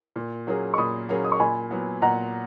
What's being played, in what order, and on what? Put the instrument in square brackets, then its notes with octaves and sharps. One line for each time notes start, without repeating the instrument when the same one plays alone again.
[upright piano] A#2
F#3 A#3 C#4 G#4
[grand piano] C#6
[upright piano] A#2 [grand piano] B5 D#6
[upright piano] F#3 A#3 C#4 G#4
[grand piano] D#6
C#6
[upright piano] A#2 [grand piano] G#5 B5
[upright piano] F#3 B3
[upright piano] A#2 [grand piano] F#5 A#5